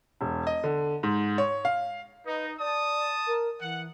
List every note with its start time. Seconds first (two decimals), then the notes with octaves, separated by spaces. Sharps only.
0.21 E1
0.47 D#5
0.64 D3
1.03 G#2
1.38 C#5
1.65 F5
2.25 D#4 B4
2.59 D5 A5 D#6
3.27 A#4
3.60 E3 F#5